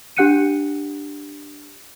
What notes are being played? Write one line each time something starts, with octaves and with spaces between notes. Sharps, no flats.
D4 G4 F#5 F#6 C#7 D#7